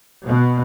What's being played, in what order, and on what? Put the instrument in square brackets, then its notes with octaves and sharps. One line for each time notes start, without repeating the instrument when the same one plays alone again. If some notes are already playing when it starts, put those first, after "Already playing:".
[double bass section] B2